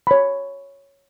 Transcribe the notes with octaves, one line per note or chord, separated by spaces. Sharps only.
C#5 B5